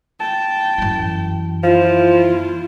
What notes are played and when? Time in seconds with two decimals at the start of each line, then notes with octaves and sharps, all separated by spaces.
0.20 G5 A5
0.78 F#2 E3
1.63 F3 E4 F4